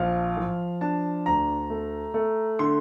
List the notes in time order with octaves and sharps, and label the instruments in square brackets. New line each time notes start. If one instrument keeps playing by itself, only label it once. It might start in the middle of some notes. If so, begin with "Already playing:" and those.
Already playing: [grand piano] A#1 F3 F5
F3
D4 A5
D2 A#5
A3
A3
D3 C6